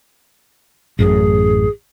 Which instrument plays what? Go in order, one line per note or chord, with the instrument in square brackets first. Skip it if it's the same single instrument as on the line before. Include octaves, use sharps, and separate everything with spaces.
[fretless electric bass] A1 F#2 A2 [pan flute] G#4